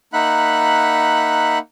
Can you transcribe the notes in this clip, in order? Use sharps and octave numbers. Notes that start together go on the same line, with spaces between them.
A#3 D#4 E5 F#5 B5 F#6